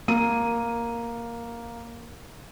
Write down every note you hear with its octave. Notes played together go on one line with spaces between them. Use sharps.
A#3 D#7